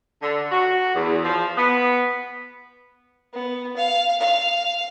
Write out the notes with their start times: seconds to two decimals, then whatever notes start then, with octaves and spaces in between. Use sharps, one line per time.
0.22 D3
0.51 F#4
0.95 E2
1.24 F3
1.58 B3
3.34 B3
3.76 F5
4.20 F5